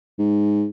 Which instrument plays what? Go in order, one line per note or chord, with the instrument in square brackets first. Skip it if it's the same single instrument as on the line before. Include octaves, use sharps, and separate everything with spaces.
[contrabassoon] G#2